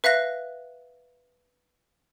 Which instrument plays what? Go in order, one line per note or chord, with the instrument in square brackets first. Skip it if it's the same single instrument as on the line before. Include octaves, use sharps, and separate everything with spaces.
[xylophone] B4 E5 F5 F#6 A#6